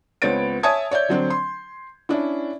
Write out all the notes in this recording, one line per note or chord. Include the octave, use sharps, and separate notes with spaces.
C#2 B3 C4 C#5 A6 D7
C#5 E5 G#5 A5 D#6 G#6
C#5 D5 E5 G6
D3 F#3 C4 D4
C6
C#4 D4 E4